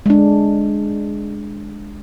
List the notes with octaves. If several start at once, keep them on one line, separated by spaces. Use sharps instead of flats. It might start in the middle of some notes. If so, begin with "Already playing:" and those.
G#3 D4